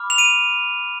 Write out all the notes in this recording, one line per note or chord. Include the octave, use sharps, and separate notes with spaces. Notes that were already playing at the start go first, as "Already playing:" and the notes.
Already playing: B5 D6 F6
F7
D#7